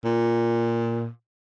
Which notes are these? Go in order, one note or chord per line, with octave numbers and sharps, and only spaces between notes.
A#2